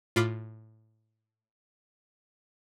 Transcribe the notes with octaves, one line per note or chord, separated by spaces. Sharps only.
A2 F4 F5 B5 D6 F6